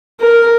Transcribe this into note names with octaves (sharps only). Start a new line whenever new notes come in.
A#4